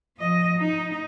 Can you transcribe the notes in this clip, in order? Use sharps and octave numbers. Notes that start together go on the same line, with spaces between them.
F3 D#5
D#4